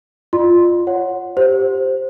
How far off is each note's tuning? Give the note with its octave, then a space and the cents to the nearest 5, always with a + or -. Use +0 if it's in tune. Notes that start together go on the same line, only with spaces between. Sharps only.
F4 +0 D5 +45 C6 +0
C#5 +0 F#5 -10
G4 +0 C5 +0